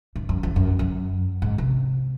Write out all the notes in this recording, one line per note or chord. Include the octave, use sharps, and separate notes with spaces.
G#2
F#2
E2
F#2
F#2
G#2
C3